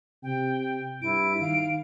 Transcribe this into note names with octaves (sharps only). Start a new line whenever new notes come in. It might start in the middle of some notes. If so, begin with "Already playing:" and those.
C3 G5
G2 E4 D7
D#3 F5